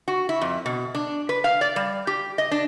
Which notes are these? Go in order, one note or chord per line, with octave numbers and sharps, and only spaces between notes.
F#4
E4
F2
B2
D4
B4
F5
D5
G3
G4
D#5
D4